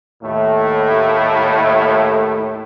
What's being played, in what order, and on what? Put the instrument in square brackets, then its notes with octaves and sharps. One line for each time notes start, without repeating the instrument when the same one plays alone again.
[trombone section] D#2 A2 A3